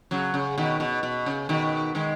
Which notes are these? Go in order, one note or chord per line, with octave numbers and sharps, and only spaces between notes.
C#3 F#3
C#3
B2 D#3
B2
B2
C#3
B2 D#3
D#3 G#3